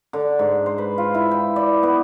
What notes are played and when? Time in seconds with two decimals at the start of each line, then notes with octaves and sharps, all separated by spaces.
0.13 D3
0.39 G#2
0.66 C5
0.78 B4
0.98 F4
1.14 E4
1.31 G5
1.56 D5
1.83 B3